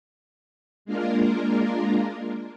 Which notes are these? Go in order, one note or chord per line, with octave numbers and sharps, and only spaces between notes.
G#3 A#3 D4 F4 A#4